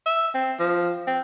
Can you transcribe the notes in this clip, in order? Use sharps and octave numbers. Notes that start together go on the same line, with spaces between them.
E5
C4
F3
C4